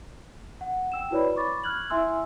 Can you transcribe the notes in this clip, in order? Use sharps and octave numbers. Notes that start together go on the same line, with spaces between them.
F#5
G5 E6 E7
E4 F#4 B4 C#5 D5 B5
B5 C#6 D6 A6
F6 F#6 G#6 F#7
E4 E5 G#5 C6 E6